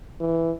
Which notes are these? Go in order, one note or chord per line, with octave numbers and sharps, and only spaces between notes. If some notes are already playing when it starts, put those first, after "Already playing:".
E3